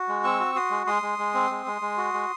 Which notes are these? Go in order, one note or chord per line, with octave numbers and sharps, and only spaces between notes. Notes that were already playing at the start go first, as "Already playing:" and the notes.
Already playing: F#4
G#3
C4 C#6 E6
F#4
F#4 C6 D#6
G#3
G#3 C6 D#6
G#3
G#3
C4
G#3
G#3
G#3
F#4
G#3